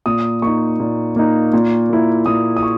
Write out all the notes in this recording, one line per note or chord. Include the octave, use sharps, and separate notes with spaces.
A#2 D#6
A#3 D#4 C#6
A#2
A#3 D#4
A#2
A#3 E4
A#2 D#6
D#6
C#6